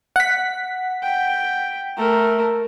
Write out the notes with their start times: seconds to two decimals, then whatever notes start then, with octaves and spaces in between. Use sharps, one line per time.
0.16 F#5 B6
1.03 G5
1.97 A3 A#4